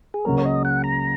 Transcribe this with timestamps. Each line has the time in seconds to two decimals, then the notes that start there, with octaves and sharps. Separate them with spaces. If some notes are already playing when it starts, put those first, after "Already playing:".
0.14 G#4
0.25 C#2 C#3 F#3 A#3 A#4
0.38 C#5
0.45 D#5
0.65 F#5
0.84 A#5